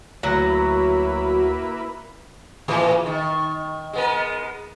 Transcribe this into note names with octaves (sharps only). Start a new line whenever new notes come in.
D2 F#3 A#3 E4 F#4 B4 A#6
A2 E3 G#4
D#3
G#3 B3 A#4